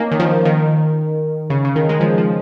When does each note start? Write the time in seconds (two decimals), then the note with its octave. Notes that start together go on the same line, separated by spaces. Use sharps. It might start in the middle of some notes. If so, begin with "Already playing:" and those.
Already playing: A#3 C#4 D#4
0.11 D#3
0.19 F3
0.45 D#3
1.50 C#3
1.65 C#3
1.76 D#3
1.89 G#3
2.00 F3
2.18 F3